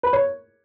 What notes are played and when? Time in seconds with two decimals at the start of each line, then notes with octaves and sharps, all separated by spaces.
0.03 B4
0.13 C#5